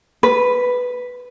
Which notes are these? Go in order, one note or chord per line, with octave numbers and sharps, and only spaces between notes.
B4